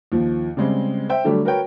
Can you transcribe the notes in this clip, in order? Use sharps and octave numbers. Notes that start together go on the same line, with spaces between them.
D#2 F3
C#3 G3 G#3 C4
C5 E5 G5
D3 F#3 G3 A3 D4
F#4 A#4 B4 C#5 G5